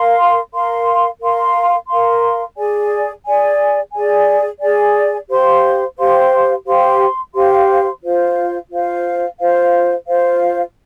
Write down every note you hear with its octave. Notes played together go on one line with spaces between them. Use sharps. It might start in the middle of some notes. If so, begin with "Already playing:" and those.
Already playing: A#4 F5 C6
A#4 F5 C6
A#4 F5 C6
A#4 F5 C6
G#4 D5 G#5
G#4 D5 G#5
G#4 D5 G#5
G#4 D5 G#5
G4 C5 F5 C6
G4 C5 F5 C6
G4 C5 F5 C6
G4 C5 F5 C6
F4 C5 F5
F4 C5 F5
F4 C5 F5
F4 C5 F5